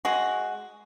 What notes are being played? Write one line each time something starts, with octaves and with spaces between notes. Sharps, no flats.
G#3 F#4